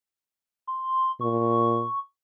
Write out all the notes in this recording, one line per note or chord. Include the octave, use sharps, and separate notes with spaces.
C6
A#2 C#6